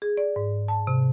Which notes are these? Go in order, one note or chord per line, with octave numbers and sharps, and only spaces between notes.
G#4
D5
G#2
A5
C3